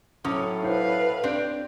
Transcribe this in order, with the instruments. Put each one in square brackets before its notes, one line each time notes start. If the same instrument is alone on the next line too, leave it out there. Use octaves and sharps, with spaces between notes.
[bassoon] A2 [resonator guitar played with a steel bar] F#3 C#4 [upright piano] A4 D6 D#6
[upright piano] E4 C5 F#5 [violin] B4 F5
[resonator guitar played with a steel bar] C4 D4 G4 [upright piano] D5